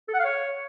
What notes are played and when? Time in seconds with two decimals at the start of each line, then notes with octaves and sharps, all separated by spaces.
0.08 A4
0.14 F#5
0.19 F5
0.25 C#5